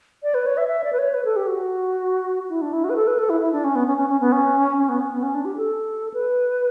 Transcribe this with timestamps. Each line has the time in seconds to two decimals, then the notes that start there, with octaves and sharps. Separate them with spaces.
0.23 D5
0.34 B4
0.46 C#5
0.57 E5
0.68 E5
0.84 D5
0.92 B4
0.98 C#5
1.14 B4
1.25 A4
1.36 G4
1.47 F#4
2.49 E4
2.61 D4
2.73 E4
2.84 F#4
2.89 B4
2.96 A4
3.07 B4
3.18 A4
3.29 E4
3.41 E4
3.52 D4
3.64 C#4
3.75 B3
3.87 C#4
3.98 C#4
4.09 C#4
4.20 B3
4.32 C#4
4.77 C#4
4.89 B3
5.00 C#4
5.11 B3
5.23 C#4
5.34 D4
5.45 G4
5.57 A4
6.14 B4